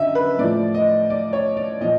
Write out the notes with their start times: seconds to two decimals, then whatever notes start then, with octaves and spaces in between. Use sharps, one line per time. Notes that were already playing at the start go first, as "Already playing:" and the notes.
Already playing: F#2 D3 D#5 E5
0.15 B4
0.39 A2 F3 D5
0.74 D#5
1.10 D5
1.33 C#5
1.57 D5
1.81 A#2 F3 D#5